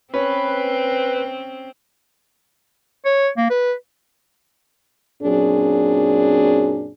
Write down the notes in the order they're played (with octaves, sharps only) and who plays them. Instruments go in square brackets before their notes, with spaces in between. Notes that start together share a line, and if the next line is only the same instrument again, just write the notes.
[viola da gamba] C4 [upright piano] C#4 [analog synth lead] B4
[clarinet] C#5
A#3
B4
[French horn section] F#2 A#2 F#3 C4 D4 G#4